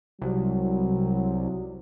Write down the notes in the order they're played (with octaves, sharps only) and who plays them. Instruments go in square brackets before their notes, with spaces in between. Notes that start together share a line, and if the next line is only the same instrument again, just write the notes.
[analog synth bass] C2 [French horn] F#3